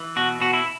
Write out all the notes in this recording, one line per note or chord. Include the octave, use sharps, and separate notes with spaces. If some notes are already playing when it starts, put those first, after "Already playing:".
Already playing: E3
B2 F#4
B2 F#4
E4